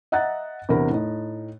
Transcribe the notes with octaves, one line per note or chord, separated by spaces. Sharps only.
D#5 E5 F#5 A#5 F#6 A6
E2 C3 D4 A#4 B5
A2 D#4